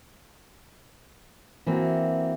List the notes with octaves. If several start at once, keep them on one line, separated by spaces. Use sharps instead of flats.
E3 A#3 C4 F#4